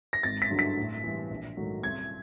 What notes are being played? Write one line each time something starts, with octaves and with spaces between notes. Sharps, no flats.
A#6
G#1 A6
B6
G2 D3 F#3
B6
A2
E3 G3
A#1
G#2 D#3 F#3 A3
C2 G#6